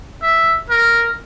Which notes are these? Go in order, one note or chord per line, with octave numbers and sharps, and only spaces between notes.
E5
A#4